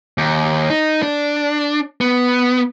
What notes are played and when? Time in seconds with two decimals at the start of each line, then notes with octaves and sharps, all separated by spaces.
0.18 D#2
0.70 D#4
1.03 D4
2.01 B3